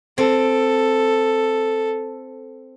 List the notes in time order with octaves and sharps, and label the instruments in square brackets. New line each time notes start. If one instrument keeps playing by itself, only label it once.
[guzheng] C4 [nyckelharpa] A4